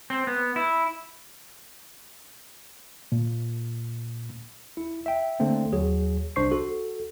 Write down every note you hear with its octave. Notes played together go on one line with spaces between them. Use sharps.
C4
B3
E4
A#2
E4
E5 G5
D3 A3 A#3 C4
D#2 F#3 G#4
C2 D4 C5 C#6 C7
F#4 A4